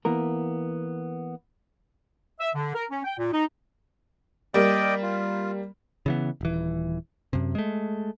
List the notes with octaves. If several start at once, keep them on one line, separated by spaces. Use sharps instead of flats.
E3 A#3 B3 A#4
E5
D3
A#4
C#4
G5
A#2
D#4
G3 A#3 D5 D#5 G5
F4
C#3 E3 B3
D#1 E3
F#2 C3
G#3 A3